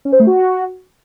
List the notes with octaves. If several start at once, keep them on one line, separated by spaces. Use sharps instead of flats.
C#4
C5
A3
F#4